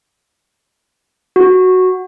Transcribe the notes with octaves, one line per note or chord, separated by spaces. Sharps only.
F#4